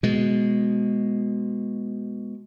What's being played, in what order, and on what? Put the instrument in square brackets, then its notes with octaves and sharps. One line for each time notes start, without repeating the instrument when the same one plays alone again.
[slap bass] B2 G#3